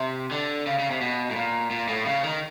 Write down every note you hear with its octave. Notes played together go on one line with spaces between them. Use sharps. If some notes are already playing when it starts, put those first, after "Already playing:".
Already playing: C3
D3
C#3
C#3
C3
B2
A2
A#2
A#2
A2
C#3
D#3